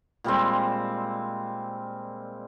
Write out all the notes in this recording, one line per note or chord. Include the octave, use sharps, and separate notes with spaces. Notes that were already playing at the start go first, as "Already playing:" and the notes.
A#2 G3 G#3 C4